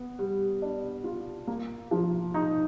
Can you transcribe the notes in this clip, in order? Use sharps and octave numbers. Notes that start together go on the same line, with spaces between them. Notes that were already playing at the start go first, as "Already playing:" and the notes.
Already playing: B3
G3
D4
F4
A#3
F3
D#4